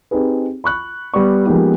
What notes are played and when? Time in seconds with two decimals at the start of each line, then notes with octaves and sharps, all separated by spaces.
0.11 C4 D#4 G4 G#4 B4
0.64 B5 C#6 F#6
1.14 G3 B3 D5 C#6
1.46 F3 G#3 A#3 B3 D#4 G4